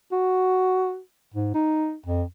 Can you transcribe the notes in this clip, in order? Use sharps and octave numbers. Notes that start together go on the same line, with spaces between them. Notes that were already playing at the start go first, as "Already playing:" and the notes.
F#4
G#2
D#4
F2